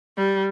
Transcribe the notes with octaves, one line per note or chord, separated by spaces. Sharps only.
G3